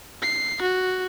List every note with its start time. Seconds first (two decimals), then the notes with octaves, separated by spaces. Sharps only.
0.23 C7
0.62 F#4